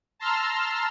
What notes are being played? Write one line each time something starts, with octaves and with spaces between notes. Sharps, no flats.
A5 A#5 C6 E6 F6